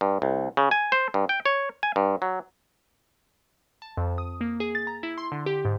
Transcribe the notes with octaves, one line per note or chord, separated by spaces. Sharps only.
G2
C2
C#3
G#5
C5
G2
G5
C#5
G#5
G2
F#3
A5
F2
D#6
A#3
G#4
A6
A#5
E4
C6
D3
G4
G#2